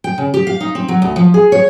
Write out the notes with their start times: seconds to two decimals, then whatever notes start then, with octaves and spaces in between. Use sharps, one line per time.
0.04 G5
0.18 C#3
0.34 G4
0.47 F5
0.60 D#4
0.75 C4
0.88 F#3
1.02 D2
1.16 F3
1.34 G#4
1.52 C#5